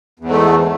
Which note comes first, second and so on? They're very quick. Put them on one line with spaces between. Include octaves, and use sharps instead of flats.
E2 G#2 A3